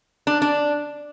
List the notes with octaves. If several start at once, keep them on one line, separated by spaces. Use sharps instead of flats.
D4
D4